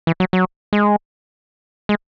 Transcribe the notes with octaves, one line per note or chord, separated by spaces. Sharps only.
E3
F#3
F#3
G#3
G#3